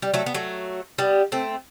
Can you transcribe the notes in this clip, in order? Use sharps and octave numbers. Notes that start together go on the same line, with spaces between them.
G3
F#3 A3
B3
F#3 A3
G3 B3
A3 C4